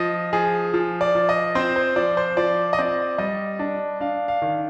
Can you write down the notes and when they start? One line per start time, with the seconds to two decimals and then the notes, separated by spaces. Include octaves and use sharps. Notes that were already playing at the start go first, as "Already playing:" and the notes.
Already playing: F3 D#5
0.33 F3 G#4
0.74 F3
1.01 D5
1.15 F3
1.29 D#5
1.55 C4 C5
1.76 C5
1.96 F3 D5
2.17 C5
2.37 F3 D5
2.73 D#5
2.79 C4 D5
3.18 G3 D#5
3.59 D4
4.00 D4 F5
4.28 F5
4.42 D#3